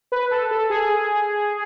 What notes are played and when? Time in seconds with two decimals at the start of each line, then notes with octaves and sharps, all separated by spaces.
0.12 B4
0.31 A4
0.51 A4
0.70 G#4